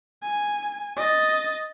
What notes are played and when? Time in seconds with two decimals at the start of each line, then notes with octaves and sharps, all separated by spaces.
0.23 G#5
0.97 D#5 A6